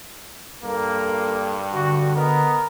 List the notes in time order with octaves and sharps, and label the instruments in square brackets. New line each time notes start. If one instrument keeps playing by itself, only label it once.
[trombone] G2 [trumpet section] A#3 [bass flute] A4
[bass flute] D3 [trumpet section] F#4
[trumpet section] B3 D#5 [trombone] A#4